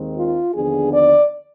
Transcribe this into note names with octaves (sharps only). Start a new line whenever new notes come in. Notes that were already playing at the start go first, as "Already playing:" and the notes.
Already playing: D#2 D#3 G#3 C4
F4
D#2 D3 F3 B3 D4 G#4
D5